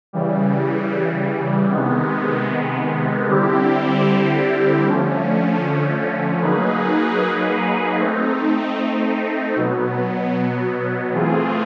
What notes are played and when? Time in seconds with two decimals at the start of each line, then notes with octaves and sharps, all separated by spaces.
0.13 C#3 E3 G3
1.70 C3 D#3 G#3 B3
3.27 D3 G3 C4 E4 G4
4.84 D3 F3 A3 C#4
6.41 F#3 A#3 D#4 G#4 B4
7.98 A3 C4 D#4
9.56 B2 F#3 B3
11.13 E3 A3 C4 F4 G#4